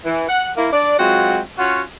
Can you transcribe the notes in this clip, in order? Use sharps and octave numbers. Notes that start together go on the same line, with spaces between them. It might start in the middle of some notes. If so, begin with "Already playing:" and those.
E3
F#5
A#3 E4
D4 D5
F#3 G#3 C4 F4 F#4
C#4 F4 F#4